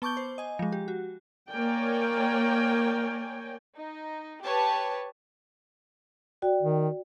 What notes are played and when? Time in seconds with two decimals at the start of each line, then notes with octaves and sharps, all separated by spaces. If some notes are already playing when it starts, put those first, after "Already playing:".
0.02 B3 A5 C#6 D6 G6 G7
0.17 C5
0.38 D#5 G#5
0.59 F3 G#3
0.72 G4
0.88 F#4
1.51 A#3 A#4 C#5 D5 G5 G#5
3.78 D#4
4.43 G4 B4 C#5 A5
6.42 F#4 D5 G5
6.62 D#3